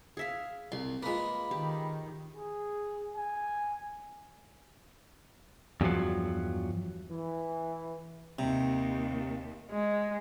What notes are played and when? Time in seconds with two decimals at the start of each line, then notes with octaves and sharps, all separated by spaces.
0.17 G#4 E5 F5
0.72 C2 C6
1.03 G#3 A#3 F4 B4 B5
1.51 D#3 G4
2.37 G#4
3.16 G#5
5.81 E2 G2 D#3 F3 F#3
7.09 E3
8.39 D#2 C3
9.71 G#3